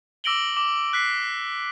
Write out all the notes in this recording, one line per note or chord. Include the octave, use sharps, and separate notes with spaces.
D6 E6 A#6 D7 F#7 G7
D6
F#6 B6 C7